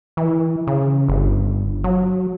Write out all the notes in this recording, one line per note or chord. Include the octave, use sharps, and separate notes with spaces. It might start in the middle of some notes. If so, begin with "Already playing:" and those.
E3
C#3
G1
F#3